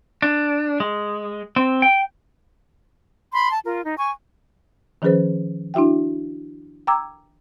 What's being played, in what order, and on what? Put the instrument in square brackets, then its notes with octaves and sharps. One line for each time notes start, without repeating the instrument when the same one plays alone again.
[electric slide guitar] D4
G#3
C4
G5
[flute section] B5 C6
A5
F4 A#4
D#4
G#5 C#6
[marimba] D#3 F3 C#4 G#4 B4 C5
D4 E4 F#4 E5 G5
G5 A#5 D6 E6 G#6